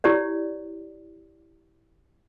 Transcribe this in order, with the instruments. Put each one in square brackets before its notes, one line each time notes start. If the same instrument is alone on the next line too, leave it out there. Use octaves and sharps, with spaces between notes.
[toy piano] E4 G4 C#5 D5